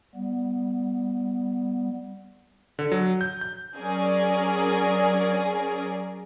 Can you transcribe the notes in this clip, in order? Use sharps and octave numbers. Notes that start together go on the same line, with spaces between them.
G3 B3
D3
F#3
G6
G6
F#3 C#4 G#4 A#4 D5